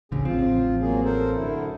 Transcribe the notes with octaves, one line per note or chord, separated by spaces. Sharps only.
A1 D2 C#3 C#4 G#4
A1 F3 C4 F4
F#3 A#3 G#4
A4 A#4 C5
F#2 D3 E4